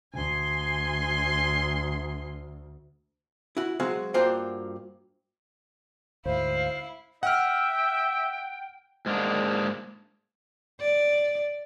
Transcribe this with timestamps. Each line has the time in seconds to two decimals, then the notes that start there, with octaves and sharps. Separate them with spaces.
0.13 D2 G#5 C6
3.57 E4 F#4
3.80 F#3 G#3 C4 F#4 F5
4.14 G2 A#3 F4 F#4 C5 G5
6.25 D2 G#2 E4 C5 F5
7.23 E5 F#5 G5 F6
9.06 G#2 G#3 A#3 D4
10.81 D5